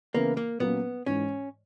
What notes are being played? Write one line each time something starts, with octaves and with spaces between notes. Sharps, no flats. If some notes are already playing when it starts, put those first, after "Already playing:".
C#3 E3 A#3 B3 E4 A#4
A#3
A#2 F#3 A#3 B3 C#4
G#2 E3 G#3 C#4